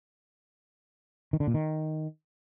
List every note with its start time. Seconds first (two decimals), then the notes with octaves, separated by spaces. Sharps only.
1.33 D#3
1.40 D3
1.47 A#2
1.54 D#3